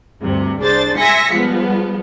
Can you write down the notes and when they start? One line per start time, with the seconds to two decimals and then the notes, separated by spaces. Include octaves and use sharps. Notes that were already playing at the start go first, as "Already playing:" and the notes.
0.21 D2 G2 C3
0.61 C2 D4 G#4 C5 A6
0.97 E5 G#5 C6 A#6 B6 C#7
1.33 F3 G3 G#3 B3